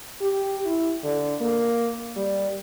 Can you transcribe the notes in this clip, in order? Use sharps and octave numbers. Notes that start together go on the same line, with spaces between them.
G4
E4
D3
A#3
G3